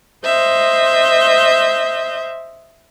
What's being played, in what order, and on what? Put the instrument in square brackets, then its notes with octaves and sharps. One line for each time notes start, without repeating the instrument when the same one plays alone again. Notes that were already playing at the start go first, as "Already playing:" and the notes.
[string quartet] C5 D#5 E5 G6